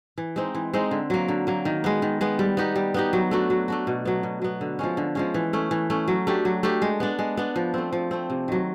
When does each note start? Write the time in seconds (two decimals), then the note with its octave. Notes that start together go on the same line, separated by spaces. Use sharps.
0.18 E3
0.36 G#3 C4 D#4
0.55 E3
0.74 G#3 C4 D#4
0.91 D3
1.10 F#3 A#3
1.28 D3
1.47 F#3 A#3
1.65 D#3
1.84 G#3 B3
2.02 D#3
2.21 G#3 B3
2.39 G3
2.57 B3 D#4 G4
2.76 G3
2.94 B3 D#4 G4
3.13 F#3
3.31 A3 D4 F#4
3.50 F#3
3.68 A3 D4 F#4
3.87 B2
4.05 F#3 B3
4.23 B2
4.42 F#3 B3
4.61 D3
4.79 F3 G#3 C#4
4.97 D3
5.15 F3 G#3 C#4
5.34 E3
5.53 A3 C#4
5.71 E3
5.90 A3 C#4
6.08 F#3
6.27 A3 D4 G4
6.45 F#3
6.63 A3 D4 G4
6.82 G#3
7.00 B3 D4
7.19 G#3
7.37 B3 D4
7.56 F3
7.74 A3 C4
7.93 F3
8.11 A3 C4
8.30 C3
8.48 D#3 F#3